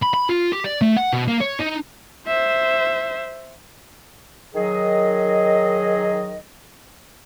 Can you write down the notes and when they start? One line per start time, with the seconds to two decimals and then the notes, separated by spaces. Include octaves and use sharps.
0.02 B5
0.13 B5
0.29 F4
0.52 G4
0.64 D5
0.82 A3
0.97 F#5
1.13 B2
1.28 A#3
1.41 C#5
1.60 D#4
2.27 C5 E5
4.55 D#3 F#3 G#4 D#5